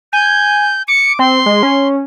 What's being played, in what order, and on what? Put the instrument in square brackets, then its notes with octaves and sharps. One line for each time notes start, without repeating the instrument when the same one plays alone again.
[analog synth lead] G#5 [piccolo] G6
[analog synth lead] D6 [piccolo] C#7
[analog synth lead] C4 [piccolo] C6
[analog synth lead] G#3
C#4